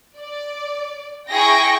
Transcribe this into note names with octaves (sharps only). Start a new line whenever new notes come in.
D5
E4 G#4 G5 C#6 A#6